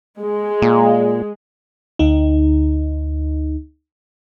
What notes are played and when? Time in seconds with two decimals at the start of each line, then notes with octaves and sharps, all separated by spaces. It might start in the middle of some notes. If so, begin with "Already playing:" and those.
0.21 G#3
0.62 A#2
1.99 D2 D#4